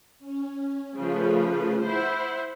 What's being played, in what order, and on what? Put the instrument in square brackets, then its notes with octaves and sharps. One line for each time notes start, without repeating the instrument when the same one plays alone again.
[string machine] C#4
[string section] C#3 F3 [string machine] A3 F4 B4
[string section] E4 C5 [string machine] F#5